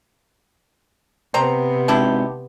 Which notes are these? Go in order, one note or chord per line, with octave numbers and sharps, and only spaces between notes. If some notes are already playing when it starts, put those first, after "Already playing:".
C3 B3 C4 C5 A#5
G#1 D4 E4 G4